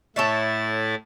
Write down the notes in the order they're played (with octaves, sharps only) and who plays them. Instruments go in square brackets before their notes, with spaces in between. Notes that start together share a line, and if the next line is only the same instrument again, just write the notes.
[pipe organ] A2 E4 A6 [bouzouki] A4 C#5 E5